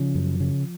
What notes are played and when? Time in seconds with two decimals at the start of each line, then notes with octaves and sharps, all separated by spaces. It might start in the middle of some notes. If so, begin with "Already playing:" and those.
Already playing: C#3 F3
0.15 F#2
0.40 C#3